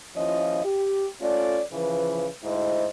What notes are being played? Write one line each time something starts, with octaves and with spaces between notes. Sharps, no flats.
D#2 F3 C#4 E4 F4 D#5
G4
A3 C#4 F4 A4 D5
C#3 E3 F3 B4
D2 G#2 E4 C5 D#5